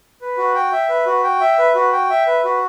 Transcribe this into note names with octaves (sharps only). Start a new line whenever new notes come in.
B4
F#4
G5
E5
B4
F#4
G5
E5
B4
F#4
G5
E5
B4
F#4